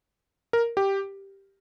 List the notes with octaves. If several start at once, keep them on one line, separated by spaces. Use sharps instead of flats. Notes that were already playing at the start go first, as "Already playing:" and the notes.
A#4
G4